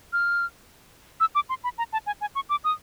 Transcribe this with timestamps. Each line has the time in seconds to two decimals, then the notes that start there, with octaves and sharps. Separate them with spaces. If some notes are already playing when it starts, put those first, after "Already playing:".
0.13 F6
1.20 E6
1.35 D6
1.49 C6
1.64 B5
1.78 A#5
1.93 A5
2.07 G#5
2.21 G#5
2.35 C#6
2.49 D6
2.64 D#6